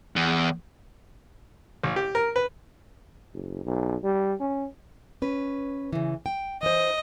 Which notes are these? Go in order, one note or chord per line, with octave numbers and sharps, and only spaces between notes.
E2
A1
G4
A#4
B4
F#1
B1
G3
C#4
C#4 B4
C#3 E3
G5
E3 C5 D#5